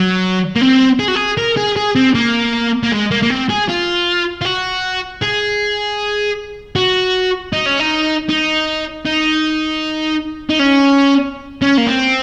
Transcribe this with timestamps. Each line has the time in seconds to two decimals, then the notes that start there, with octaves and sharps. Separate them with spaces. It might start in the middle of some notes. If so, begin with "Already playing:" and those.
Already playing: F#3
0.56 A#3
0.61 C4
1.00 G#4
1.08 F#4
1.15 G#4
1.38 A#4
1.57 G#4
1.76 G#4
1.96 C4
2.15 A#3
2.83 A#3
2.92 G#3
3.11 A#3
3.22 A#3
3.30 C4
3.49 G#4
3.68 F4
4.42 F4
4.45 F#4
5.22 G#4
6.76 F#4
7.53 D#4
7.66 C#4
7.80 D#4
8.29 D#4
9.06 D#4
10.50 D#4
10.60 C#4
11.62 C#4
11.78 A#3
11.87 C4